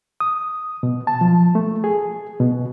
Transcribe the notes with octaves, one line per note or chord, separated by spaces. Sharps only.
D#6
B2
A5
F3
A3
G#4
B2